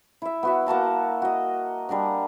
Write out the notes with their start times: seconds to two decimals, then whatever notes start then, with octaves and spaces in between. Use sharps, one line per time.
0.22 E4 E5
0.43 B3 F#4 E5
0.67 A#3 F#4 A5 A#5
1.22 F#4 D#5
1.89 G3 D4 A#4 F#5